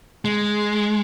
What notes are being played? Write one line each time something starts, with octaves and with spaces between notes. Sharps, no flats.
G#3